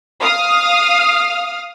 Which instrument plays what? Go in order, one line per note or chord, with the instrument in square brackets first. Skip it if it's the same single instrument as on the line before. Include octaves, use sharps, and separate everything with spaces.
[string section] F5 D#6 F6